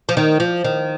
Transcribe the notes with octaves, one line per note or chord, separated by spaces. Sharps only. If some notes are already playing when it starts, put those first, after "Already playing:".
F3
D#3
F3
D#3